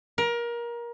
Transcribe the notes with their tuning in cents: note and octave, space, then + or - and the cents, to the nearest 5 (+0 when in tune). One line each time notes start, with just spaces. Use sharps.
A#4 +25